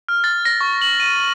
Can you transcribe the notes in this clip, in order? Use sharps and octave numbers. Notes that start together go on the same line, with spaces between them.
F6
A6
A#6
C#6
F#7
D#7